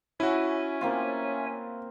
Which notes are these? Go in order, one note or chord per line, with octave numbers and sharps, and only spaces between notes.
C#4 E4 F#4 C#5 E5 G#5
A#3 C4 F4